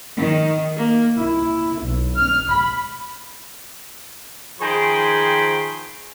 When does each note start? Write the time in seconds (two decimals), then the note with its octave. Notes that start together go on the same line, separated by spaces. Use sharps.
0.16 D#3
0.76 A#3
1.18 E4
1.81 B1
2.18 F6
2.50 B5
4.60 D#3 F3 G#4 G5 B5 C6